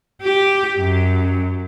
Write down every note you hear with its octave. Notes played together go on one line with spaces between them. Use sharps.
G4
F#2